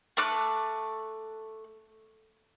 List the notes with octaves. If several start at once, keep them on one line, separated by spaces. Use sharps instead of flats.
A3 D6 F#6